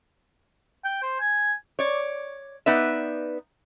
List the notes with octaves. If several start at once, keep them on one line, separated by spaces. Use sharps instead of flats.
G5
C5
G#5
C#5 D5
B3 D#4 B4 D5 E5